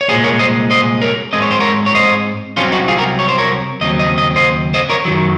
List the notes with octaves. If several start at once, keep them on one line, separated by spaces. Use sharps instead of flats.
C#5
C2 A#2 G#3 G#4 C5
A#4 C#5
C5 D#5
C5 D#5
A#4 C#5
G#2 D#3 G#3 C4 D#5
C#5
C5
A#4 C#5
C#5
C5 D#5
C2 C3 F#3 C4 C#4 F4
D#4 F#4
F4 G#4
F#4 A#4
C#5
C5
A#4 C#5
D#2 C#3 F#3 C4 D#5
D#5
D#5
C5 D#5
C5 D#5
A#4 C#5
F#2 D#3 F#3